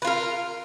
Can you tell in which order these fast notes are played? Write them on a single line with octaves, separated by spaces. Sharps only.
B4 F4 A#4